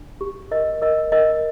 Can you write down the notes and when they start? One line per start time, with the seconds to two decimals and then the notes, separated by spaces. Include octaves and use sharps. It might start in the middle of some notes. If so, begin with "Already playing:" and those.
Already playing: D4
0.21 G4
0.51 A#4 D#5
0.82 A#4 D#5
1.12 A#4 D#5